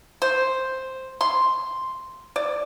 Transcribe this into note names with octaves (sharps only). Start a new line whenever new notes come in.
C5
C6
D5